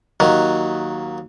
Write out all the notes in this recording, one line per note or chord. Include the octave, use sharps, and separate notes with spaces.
D#2 D#3 F#3